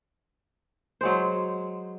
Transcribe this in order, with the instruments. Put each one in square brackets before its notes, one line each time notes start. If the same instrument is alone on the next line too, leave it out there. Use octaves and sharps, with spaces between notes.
[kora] F#3 G#3 C5